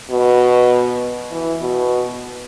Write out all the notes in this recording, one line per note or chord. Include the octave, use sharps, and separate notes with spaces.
B2
E3
B2